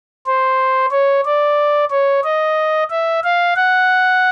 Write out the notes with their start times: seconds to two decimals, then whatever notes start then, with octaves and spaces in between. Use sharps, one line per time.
0.26 C5
0.91 C#5
1.25 D5
1.91 C#5
2.24 D#5
2.90 E5
3.24 F5
3.56 F#5